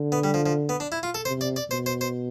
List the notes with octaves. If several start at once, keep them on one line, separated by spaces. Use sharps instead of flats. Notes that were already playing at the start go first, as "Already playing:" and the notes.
Already playing: D3
B3
G3
F3
F3
B3
D4
E4
F4
A4
C3 C5
D5
D5
B2 C5
C5
C5